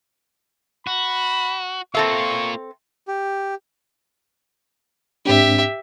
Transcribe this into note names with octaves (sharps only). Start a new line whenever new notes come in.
F#4 B5
A#3 C4 F4 A4 E5 C#6
G4
G#2 C4 D4 G4 E5